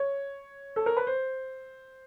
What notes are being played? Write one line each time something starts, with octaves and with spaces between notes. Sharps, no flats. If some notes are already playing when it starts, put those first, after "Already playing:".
Already playing: C#5
A4
A#4
B4
C5